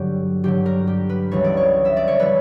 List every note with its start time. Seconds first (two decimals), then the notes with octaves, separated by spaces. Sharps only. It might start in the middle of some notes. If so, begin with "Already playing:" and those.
Already playing: G2 D3 F#3 G4
0.44 G2 D3 F#3 G4
0.66 A#4
0.87 G4
1.09 B4
1.31 C#2 C#3 E3 G3 C#5
1.44 D5
1.57 C#5
1.85 E5
1.97 D5
2.08 C#5
2.19 C#3 E3 G3 B4